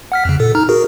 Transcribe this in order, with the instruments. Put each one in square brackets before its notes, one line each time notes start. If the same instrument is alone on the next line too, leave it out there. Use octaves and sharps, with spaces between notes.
[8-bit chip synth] F#5 F6 B6
F2 C#3
A#2 A4
D#4 A#5 F6
F#4 G#4 A#4